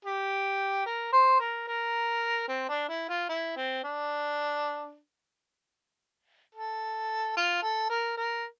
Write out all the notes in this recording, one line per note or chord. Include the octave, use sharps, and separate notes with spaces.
G4
A#4
C5
A#4
A#4
C4
D4
E4
F4
E4
C4
D4
A4
F4
A4
A#4
A#4